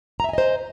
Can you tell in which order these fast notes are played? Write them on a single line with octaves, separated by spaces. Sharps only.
A#5 E5 G#5 D#5 C5